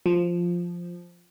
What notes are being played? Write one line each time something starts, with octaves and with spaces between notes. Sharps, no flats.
F3